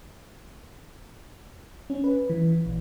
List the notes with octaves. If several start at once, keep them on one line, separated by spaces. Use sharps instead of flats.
C#4
B4
E3
A#1